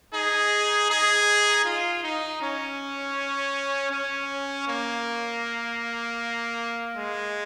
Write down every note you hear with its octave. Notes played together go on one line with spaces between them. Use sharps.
D#4 G#4
D#4 G#4
F4
D#4
C#4
C#4
A#3
G#3